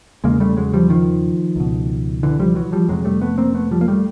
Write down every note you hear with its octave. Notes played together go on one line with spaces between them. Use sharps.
E2 C#3 G#3 A#3
G3 A3
F#3 G#3
F3 G3
D#3 F3
C#2 B2
D3 E3
F3 G3
E3 F#3
F3 G3
F2 C3 F#3 G#3
G3 A3
A3 B3
A#3 C4
A3 B3
F3 G3
A#3
G3 A3